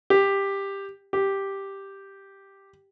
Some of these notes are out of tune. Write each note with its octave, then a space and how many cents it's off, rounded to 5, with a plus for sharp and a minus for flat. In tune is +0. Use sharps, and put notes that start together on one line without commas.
G4 +10
G4 +0